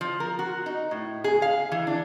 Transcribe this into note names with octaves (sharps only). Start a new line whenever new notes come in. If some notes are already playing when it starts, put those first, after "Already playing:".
F3
A#4
F#4
D#4
A2
G#4
F5
E3
D4